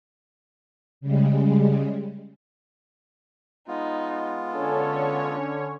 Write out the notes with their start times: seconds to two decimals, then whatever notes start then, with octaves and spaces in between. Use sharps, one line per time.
1.01 C#3 G3 G#3
3.68 G#3 B3 D#4 F4
4.52 D3 C#4 A4 C#5